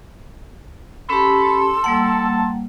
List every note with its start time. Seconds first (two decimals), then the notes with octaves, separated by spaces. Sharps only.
1.10 C#4 G4 A4 B5 C6
1.84 G3 A#3 F#5 A5